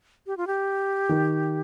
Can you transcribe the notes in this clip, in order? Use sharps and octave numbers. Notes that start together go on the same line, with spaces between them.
G4
F4
G4
D#3